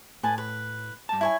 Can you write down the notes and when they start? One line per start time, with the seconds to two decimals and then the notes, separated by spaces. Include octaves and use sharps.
0.23 A2 B4 G#5 A5
0.38 B4
1.09 G2 A5
1.21 E4 C#5 G#5